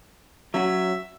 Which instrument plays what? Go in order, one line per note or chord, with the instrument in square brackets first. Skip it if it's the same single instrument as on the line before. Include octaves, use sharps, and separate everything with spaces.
[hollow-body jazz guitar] F#3 C#4 F#4 [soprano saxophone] E5